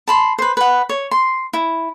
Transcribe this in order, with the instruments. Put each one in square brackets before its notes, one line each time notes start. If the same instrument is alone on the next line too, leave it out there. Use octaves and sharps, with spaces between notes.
[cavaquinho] A5 B5 C6
B4 C5
B4 F#5
C#5
C6
E4